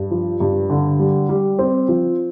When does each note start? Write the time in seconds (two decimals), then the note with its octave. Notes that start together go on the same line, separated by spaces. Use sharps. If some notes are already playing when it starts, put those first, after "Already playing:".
Already playing: G2
0.11 F3
0.40 G2
0.70 D3
0.99 G3
1.29 G3
1.59 C4
1.88 F3